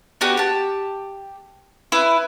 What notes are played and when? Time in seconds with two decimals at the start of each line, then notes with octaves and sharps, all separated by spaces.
0.21 B3 D4 F#4 G4
0.37 G4 A5
1.92 E4 B4 G#5